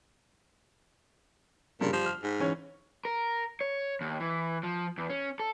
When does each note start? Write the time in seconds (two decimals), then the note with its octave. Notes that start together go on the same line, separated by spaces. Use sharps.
1.81 G2 A#2 C#3
1.93 F3 G3
2.06 F6
2.23 G#2
2.40 E3 C#4 C#5
3.05 A#4
3.61 C#5
4.01 D#2
4.20 E3
4.63 F3
4.98 E2
5.10 C#4
5.40 A4